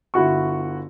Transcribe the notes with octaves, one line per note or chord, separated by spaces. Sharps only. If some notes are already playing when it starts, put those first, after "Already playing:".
G1 E4 F#4 C#6